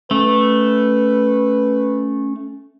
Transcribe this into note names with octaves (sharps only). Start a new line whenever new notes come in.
A3 C#4 B4